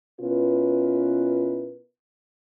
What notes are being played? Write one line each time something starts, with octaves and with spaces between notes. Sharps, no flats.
B2 C#4 E4 F4 A#4 B4